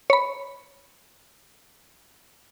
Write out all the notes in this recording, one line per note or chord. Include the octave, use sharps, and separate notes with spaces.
C#5 B5